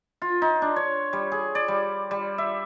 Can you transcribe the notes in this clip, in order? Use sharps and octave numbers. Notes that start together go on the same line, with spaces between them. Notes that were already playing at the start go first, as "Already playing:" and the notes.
F4
D#4
D4
C#5
G3
G#4
D5
G3
G3
E5